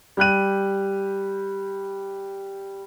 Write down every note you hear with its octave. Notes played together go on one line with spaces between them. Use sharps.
G3 G4 F#6 D#7